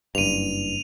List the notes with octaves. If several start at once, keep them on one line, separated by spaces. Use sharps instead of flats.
F#1 G2 D#7 F7